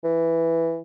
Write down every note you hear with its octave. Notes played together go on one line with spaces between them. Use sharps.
E3